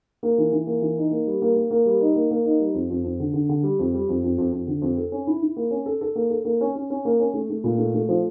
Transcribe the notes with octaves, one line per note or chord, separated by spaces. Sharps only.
A#3
E3
E3
A#3
E3
D#4
A#3
G3
A#3
A#3
A#3
G3
D#4
A#3
A#3
D#4
G3
F2
F2
F2
D3
D3
D3
G3
F2
G3
F2
F2
F2
F2
D3
F2
A4
C#4
E4
E4
A#3
C#4
A4
A4
A#3
A4
A#3
C#4
C#4
C#4
A#3
C#4
A3
A3
A#2
A3
A3
F3